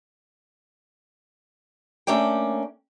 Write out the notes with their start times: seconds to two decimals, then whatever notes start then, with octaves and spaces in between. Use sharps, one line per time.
2.07 A3 A#3 C#4 D4 G5